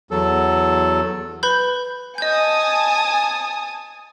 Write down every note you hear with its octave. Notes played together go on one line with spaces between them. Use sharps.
E2 F#3 A4
B4 B5 G6
D#5 G#5 A5 D#6 G6